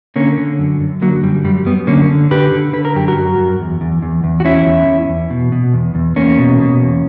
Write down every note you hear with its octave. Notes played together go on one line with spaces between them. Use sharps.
D3 A#3 C#4
D3
F#2
F#2
D3 F#3 A#3
F#2 G3
F#2 G3
F#2 G3 B3
D3 A#3 C#4
D3
D3 G4 B4
D3
D3 B4
A#4
F#2 G4
F#4 A#4
F#2
F#2
E2
E2
E2
E2
F#4
E2 C#4 E4
E2
E2
E2
B2
B2
E2
E2
E2 A#3 C#4
B2
B2
E2